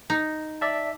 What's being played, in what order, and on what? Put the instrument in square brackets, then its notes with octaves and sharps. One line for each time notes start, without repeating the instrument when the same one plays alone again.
[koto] D#4
[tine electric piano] D5 E5 A5